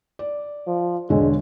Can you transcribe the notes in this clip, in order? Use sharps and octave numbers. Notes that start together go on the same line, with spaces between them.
D5
F3
E1 D3 G#3 C#5